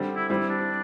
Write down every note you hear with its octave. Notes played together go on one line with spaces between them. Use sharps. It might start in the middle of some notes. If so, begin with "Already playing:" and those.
Already playing: D3 G3 C4
E4
E3 G3 C4 E4
D4